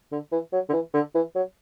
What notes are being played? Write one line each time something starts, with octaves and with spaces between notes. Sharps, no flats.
D3
E3
F#3
D3
E3
D3
E3
F#3